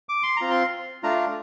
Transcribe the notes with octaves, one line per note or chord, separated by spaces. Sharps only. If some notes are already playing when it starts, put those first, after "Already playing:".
D6
C6
C4 F4 A#5
C6
A3 D4 F4 A#5